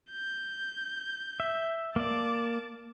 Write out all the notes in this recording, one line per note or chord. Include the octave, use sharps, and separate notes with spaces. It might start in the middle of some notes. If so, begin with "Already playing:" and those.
G6
E5
A#3 D5 A5 D6